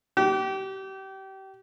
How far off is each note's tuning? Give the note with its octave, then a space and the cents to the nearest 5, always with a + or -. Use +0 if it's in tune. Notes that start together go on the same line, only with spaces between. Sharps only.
G4 -30